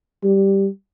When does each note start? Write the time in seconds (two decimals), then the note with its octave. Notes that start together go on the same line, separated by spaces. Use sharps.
0.24 G3